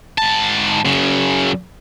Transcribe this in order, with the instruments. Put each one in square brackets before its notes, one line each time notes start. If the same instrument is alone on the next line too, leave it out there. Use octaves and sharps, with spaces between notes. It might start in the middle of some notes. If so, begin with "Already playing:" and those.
[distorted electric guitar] G#2 A5
F#2 C#3